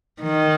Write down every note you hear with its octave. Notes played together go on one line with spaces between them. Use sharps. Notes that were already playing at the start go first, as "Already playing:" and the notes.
D#3